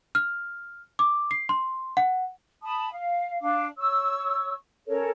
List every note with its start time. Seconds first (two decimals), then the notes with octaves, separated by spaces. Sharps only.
0.15 F6
0.99 D6
1.31 C7
1.49 C6
1.97 F#5
2.63 A5 B5 D#6
2.91 F5
3.41 D4 F5 D6
3.78 C#5 C#6 E6
4.87 C#4 A4 A#4 C#5